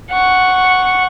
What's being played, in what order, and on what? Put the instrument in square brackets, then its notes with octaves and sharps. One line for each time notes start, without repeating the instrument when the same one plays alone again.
[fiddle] F#5 C#6